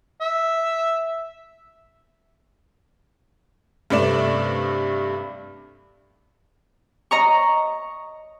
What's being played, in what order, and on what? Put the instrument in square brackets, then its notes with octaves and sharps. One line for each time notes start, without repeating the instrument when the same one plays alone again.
[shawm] E5
[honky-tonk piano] G2 C3 A3 D5 E7
[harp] D#5 A#5 C#6